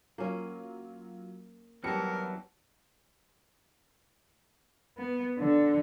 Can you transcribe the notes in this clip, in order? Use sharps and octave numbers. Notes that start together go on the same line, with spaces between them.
F#3 A#3 C#4 F4
E2 E3 F#3 G3 A#4 A5 C#7
B3
D3